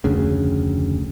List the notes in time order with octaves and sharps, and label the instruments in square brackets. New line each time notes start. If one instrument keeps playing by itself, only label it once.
[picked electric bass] F1 D2 C#3